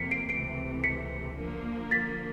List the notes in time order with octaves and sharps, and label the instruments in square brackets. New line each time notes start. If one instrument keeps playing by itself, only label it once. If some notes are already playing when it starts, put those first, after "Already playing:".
Already playing: [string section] F2 C3 F3 A#3 [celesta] B6 C#7
[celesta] C7 D7
[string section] C#2 C3 E3 A3 [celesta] C7 D7
[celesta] B6 C#7
[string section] D3 F3 A#3
[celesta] A6 B6